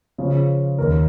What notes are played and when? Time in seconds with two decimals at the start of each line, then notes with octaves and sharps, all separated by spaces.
0.18 C#3 F3 C#4 F4
0.78 D#2 D#3 C#4 A#4